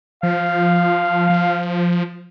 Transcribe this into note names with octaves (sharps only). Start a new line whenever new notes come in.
F3 F5
F3